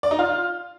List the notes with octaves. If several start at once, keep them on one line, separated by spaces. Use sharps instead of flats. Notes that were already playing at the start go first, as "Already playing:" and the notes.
D5
D#4
F4